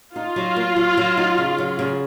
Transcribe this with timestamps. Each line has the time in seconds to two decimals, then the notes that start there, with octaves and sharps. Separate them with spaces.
0.16 D#4 F4
0.36 F#3
0.56 A#3
0.76 F#3
0.97 F#3
1.17 D#4
1.38 C#3
1.58 F#3
1.79 C#3